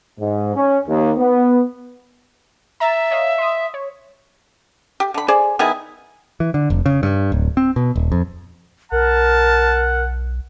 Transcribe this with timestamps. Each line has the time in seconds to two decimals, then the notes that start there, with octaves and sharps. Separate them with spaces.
0.20 G#2
0.56 C#4
0.88 D#2
1.18 B3
2.80 E5 A#5 A6
3.11 C#5 D#5 F5
3.38 C6 D#6
3.74 C#5
5.00 G4
5.14 D3 B5
5.28 G#4 C5 D5
5.59 D#3 B3 E4 G#4
6.40 E3
6.54 D3
6.70 F1
6.86 C#3
7.03 G2
7.32 D1
7.57 C4
7.76 B2
7.96 D#1
8.12 F2
8.92 B1 A#4 F#5 A5